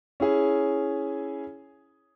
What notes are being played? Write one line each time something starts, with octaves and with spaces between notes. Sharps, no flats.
C#4 E4 G#4